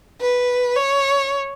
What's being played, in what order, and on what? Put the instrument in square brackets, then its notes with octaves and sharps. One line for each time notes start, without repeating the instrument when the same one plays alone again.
[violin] B4
C#5